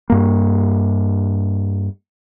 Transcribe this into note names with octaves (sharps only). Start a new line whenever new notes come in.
G2 A#3